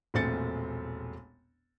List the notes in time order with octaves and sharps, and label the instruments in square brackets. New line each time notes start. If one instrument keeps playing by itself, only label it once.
[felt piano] E1 A#1 A3 C4 A6 C#7